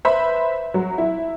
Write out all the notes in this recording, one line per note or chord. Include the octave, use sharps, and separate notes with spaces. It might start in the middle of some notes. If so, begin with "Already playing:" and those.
B4 C5 E5 B5
F#3
E4